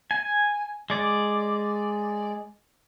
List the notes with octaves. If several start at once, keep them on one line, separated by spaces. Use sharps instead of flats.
G#5
G#3 D5